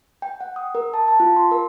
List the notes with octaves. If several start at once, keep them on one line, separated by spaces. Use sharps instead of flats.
G5
F#5
D#6
A#4
A5
A5
F4
C6
A#4